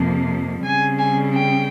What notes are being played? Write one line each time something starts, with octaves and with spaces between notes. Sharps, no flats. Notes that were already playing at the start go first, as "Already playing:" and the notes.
Already playing: F2 C3 F3 A#3
C#3 G3 C4 G#5
G#5
G5